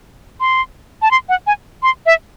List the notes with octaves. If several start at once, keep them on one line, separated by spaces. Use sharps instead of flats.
C6
A5
C6
F#5
G#5
C6
E5